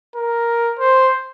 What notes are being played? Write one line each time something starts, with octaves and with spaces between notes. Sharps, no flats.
A#4
C5